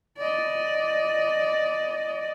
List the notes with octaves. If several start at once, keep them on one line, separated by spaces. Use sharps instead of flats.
D5 D#5